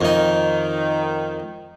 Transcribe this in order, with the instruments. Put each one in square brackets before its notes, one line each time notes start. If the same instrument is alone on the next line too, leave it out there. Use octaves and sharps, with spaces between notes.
[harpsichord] F2 D#4 [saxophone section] D#3